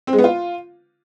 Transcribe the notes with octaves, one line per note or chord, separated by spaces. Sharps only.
C4
G#3
B3
F4